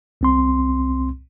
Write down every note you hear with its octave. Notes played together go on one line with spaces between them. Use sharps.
C2 C4 C6